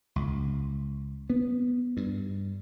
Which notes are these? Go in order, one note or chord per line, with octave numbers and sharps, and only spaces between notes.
C#2
B3
G2